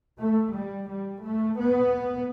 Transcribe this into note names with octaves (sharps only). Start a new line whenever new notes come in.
A3
G3
G3
A3
B3